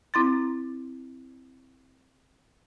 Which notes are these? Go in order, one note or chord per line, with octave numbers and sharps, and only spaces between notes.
C4 E4 C6 A6